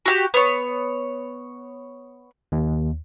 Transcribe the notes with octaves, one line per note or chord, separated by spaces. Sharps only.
F#4 G4
B3 C#5
D#2